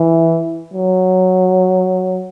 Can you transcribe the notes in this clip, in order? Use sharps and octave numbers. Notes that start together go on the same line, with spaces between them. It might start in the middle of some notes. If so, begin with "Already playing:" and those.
Already playing: E3
F#3